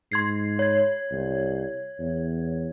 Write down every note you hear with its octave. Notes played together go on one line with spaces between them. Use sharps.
G#2 C6 G#6 C7
C#5 G#6
C2
E2